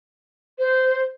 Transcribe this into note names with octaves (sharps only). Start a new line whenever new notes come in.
C5